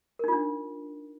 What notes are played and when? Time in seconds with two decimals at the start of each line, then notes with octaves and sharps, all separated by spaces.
0.19 A#4
0.24 D#4
0.28 F4
0.33 D4